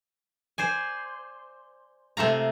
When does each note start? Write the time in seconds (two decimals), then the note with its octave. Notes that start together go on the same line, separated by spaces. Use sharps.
0.58 C5 D5 G#5
2.17 C3 A3 F4 A#5